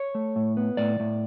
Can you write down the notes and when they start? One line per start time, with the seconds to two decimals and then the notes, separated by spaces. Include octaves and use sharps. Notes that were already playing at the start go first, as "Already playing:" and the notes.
Already playing: C#5
0.15 A3
0.36 A2
0.57 B3
0.77 A2 D5
1.00 A2